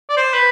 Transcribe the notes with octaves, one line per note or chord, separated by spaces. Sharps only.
D5
C5
B4